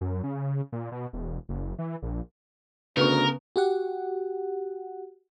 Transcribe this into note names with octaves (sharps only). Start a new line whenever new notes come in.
F#2
C#3
A#2
B2
E1
F#1
E3
A#1
D2 C#3 B3 A#4 B4 C#6
F#4 G4 F#5